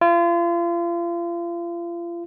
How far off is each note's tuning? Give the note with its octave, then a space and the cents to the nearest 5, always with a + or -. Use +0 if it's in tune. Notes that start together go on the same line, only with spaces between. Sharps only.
F4 -35